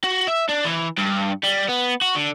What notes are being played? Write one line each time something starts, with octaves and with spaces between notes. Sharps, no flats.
F#4
E5
D4
E3
G2
G3
B3
F#4
D3